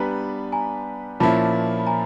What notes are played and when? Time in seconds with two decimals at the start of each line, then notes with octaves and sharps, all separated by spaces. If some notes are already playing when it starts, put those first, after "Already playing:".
Already playing: G3 B3 D4 G4 B4 G#5 A#5
0.52 G#5 A#5
1.20 A#2 F3 A#3 C#4 E4 A5 B5
1.80 B5
1.87 G#5 A#5